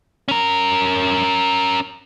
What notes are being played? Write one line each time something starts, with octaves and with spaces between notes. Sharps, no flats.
C#4 A#4